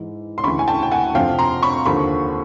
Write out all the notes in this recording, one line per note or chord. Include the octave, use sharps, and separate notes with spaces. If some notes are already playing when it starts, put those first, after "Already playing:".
Already playing: G#2 E3
C6
D2 C#3 E3 B5 C#6
G#5
G5 A5
G5
F#5 G#5
F2 C3 F3 F5 G5
A#5 C6
B5 C#6
D#2 D3 F3 B5 C#6